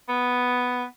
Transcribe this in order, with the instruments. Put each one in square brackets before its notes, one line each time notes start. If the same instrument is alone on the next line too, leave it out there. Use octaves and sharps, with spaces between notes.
[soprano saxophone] B3